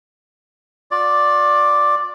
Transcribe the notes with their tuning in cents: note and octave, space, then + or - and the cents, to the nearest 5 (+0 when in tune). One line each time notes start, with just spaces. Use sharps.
F4 +45 D5 +0